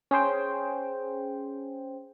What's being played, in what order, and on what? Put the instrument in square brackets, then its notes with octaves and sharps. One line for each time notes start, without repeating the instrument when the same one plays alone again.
[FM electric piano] C#4 G#4 C5 G5